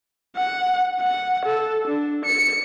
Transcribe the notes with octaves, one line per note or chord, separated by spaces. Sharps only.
F#5
F#5
A4
D4
C#7